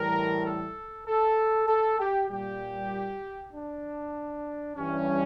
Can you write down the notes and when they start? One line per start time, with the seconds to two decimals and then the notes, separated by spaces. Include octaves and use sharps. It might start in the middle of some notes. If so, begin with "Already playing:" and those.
Already playing: A2 E3 G3 A#4
0.45 A4
1.06 A4
1.68 A4
1.99 G4
2.30 A#2 G3 G4
3.53 D4
4.77 G2 E3 G3 C#4